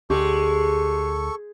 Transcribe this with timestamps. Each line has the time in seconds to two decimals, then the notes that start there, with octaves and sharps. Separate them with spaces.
0.10 D2 G#3 G4 A4 C#6